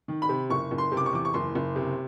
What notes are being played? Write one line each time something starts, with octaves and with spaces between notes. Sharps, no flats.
D#3
B5
C3
F#1 C#6
F#1
C6
C3
D6
C#6
E2 D6
C#6
F#1 C6
F#1
C3